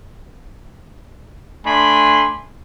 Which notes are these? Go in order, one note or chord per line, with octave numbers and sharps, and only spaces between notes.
A3 D4 G#5 B5 C6